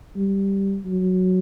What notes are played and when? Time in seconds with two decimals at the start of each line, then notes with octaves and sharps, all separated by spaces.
0.16 G3
0.86 F#3